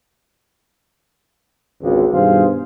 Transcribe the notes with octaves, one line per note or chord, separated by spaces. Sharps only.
G#1 C#2
G2 B2 D#3 G#4 C5 F5